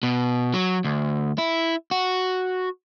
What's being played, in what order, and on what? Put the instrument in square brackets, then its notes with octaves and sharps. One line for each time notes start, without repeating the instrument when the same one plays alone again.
[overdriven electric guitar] B2
F#3
D2
E4
F#4